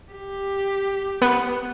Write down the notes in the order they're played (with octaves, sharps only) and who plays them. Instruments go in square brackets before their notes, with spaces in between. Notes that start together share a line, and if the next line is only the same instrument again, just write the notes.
[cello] G4
[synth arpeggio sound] B3 [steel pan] B4